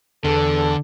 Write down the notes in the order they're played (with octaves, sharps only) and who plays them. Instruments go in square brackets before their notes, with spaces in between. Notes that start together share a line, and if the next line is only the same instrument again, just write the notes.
[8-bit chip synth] E2 [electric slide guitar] D3 [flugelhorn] A4